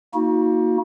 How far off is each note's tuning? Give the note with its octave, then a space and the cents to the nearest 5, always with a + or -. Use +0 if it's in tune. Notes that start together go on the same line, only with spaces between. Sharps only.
A#3 +0 D#4 +35 F#4 -20